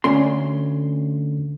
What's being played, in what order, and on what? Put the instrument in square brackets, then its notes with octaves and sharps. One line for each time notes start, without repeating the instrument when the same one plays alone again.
[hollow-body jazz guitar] D2 C#4 C6